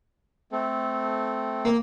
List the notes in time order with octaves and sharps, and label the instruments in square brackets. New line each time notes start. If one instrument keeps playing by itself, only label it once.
[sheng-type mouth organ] A3 C4 A4
[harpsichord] A#3